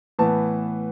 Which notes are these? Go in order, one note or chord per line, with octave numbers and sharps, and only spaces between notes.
A2 E3 B3 A5